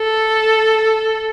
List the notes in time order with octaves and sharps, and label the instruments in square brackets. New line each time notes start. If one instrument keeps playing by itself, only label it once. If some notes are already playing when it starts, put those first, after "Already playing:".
Already playing: [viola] A4